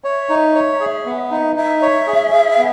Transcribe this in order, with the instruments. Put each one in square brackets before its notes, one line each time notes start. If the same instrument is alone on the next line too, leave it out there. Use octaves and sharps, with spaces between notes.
[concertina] C#5 [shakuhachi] E5
[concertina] D#4
C#5
G#4
B3
D#4
[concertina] D#4 [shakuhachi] E5
[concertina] C#5
G#4
G#4
B3